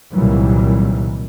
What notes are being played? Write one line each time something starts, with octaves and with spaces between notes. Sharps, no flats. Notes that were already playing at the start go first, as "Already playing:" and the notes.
C2 A#2 D#3 E3 F#3 G3